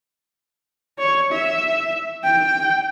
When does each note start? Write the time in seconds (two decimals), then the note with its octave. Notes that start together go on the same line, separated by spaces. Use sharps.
0.99 C#5
1.32 E5
2.24 G5